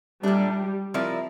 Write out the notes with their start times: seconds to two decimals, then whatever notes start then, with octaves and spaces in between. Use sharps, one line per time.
0.23 A#2 G3 A3 D4
0.94 F3 C4 E4 A#4 D5